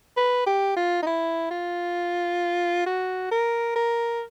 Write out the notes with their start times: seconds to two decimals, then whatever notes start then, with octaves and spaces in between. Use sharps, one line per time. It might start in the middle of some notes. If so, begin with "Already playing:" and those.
0.17 B4
0.46 G4
0.76 F4
1.02 D#4
1.07 E4
1.51 F4
2.86 F#4
3.31 A#4
3.75 A#4